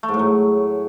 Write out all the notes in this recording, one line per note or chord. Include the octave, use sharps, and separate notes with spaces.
A3
G#2
A2
F#3